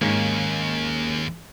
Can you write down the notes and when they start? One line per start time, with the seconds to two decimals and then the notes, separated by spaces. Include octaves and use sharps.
0.02 D#2 G#2 A#3 C#4